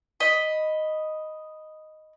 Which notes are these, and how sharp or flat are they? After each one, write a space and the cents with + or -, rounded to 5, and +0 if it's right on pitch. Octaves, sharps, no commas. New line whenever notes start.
D#5 +0 B5 +0